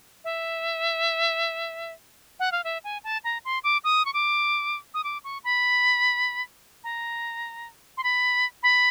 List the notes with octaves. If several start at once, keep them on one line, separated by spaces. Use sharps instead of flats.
E5
F#5
F5
E5
G#5
A5
A#5
C6
D6
D#6
C#6
D6
D#6
D6
C#6
B5
A#5
C6
B5
B5